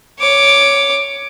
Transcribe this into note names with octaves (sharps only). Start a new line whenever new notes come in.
C#5 D6